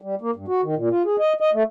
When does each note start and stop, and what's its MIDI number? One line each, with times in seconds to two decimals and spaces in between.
0.02 0.15 55
0.21 0.31 58
0.36 0.46 43
0.48 0.61 66
0.63 0.75 51
0.76 0.89 46
0.90 1.03 65
1.06 1.16 68
1.19 1.33 75
1.40 1.50 75
1.54 1.63 57